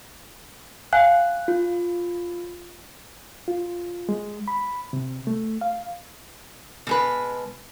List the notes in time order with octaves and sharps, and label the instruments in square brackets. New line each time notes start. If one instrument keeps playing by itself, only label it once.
[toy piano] F5 F#5 G#5 [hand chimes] F#6
[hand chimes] F4
[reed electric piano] F4
G#3
B5
C3
A3
F5
[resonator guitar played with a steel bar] B2 G#3 B4